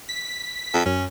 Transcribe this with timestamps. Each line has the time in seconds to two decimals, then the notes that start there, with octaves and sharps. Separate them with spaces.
0.09 B6
0.74 F2
0.86 F#2 C#4